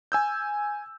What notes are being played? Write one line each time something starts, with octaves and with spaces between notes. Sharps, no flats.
G#5 E6 G6